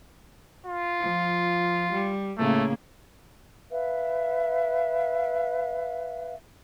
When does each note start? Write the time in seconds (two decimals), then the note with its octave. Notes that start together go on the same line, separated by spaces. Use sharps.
0.66 F4
1.00 F3
1.93 G3
2.38 A2 C#3 A3 A#3
3.70 B4 E5 F5